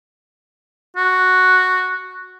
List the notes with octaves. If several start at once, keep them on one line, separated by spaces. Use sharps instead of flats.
F#4